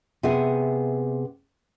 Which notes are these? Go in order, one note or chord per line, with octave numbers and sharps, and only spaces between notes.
C3 B3 G#4 E5 F#5 G#5